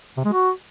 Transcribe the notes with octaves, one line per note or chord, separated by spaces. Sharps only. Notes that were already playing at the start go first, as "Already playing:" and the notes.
C3
G#3
F#4